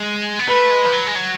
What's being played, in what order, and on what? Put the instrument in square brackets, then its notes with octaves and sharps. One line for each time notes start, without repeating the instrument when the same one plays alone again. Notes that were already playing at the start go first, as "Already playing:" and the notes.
Already playing: [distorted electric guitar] G#3
B3
[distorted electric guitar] A3 [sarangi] B4
[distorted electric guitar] G#3
F3
F#3
G#3
F#3